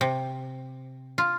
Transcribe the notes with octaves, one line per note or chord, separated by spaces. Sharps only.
C3
F4